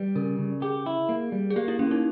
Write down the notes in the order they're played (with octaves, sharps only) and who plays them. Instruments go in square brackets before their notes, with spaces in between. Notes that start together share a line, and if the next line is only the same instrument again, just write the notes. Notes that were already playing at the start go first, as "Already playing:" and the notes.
Already playing: [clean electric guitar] G3 [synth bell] B4
[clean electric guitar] C#3 [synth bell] A#4
[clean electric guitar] C#3
[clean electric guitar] G4 [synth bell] G#4
[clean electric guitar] E4
A#3
G3
[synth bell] G#4
[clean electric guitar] A#3 [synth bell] G4
[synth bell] E4
[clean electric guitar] A#3 [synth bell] C#4
[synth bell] D#4